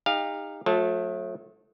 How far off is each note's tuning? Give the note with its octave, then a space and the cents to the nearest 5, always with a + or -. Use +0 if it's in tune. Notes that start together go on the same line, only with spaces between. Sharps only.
D#4 +0 G4 +40 F5 +0
F#3 -45 A3 +0 A5 +0